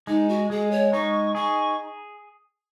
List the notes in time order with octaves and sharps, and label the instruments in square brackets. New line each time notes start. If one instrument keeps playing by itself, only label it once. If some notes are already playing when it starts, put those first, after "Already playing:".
[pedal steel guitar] G#3 [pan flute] D#4
[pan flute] F#4
[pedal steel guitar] G#3 [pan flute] G#4
[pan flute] C#5
[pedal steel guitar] D#4 [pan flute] C#6
[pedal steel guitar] G#4 [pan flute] C#6